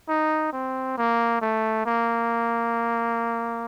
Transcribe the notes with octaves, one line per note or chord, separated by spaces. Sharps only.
D#4
C4
A#3
A3
A#3